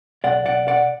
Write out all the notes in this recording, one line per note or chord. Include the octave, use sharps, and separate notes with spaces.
B1 D5 F#5
B1 D5 F#5
B2 D5 F#5